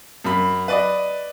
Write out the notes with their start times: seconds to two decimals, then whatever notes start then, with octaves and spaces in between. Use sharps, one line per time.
0.24 F#2 B5
0.68 B4 D5 D#5